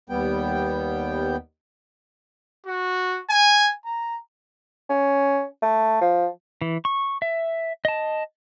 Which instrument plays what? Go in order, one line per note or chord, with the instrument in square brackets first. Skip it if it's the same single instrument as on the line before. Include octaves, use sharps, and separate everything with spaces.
[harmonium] D#2 G3 B3 G5
[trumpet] F#4
G#5
A#5
[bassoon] C#4
A3
F3
[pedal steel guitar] E3
C#6
E5
D#5 A5